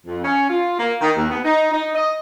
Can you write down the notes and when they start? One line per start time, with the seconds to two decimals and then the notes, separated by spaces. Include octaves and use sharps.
0.06 F2
0.23 C#4
0.49 F4
0.78 A#3
0.99 D#3
1.15 D#2
1.29 B3
1.44 D#4
1.71 D#4
1.94 D#5